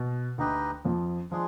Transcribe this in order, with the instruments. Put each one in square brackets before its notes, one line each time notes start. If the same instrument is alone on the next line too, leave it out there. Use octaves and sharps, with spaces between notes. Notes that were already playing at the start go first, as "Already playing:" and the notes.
Already playing: [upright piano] B2
[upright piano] D2 D3 [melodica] D#4 G4 B4 D#5
[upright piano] F2 F3
[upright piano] F3 [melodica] G#3 D4 G#4